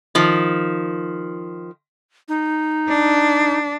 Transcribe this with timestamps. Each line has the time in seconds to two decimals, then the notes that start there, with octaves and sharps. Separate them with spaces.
0.15 D#3 F3
2.29 D#4
2.89 D4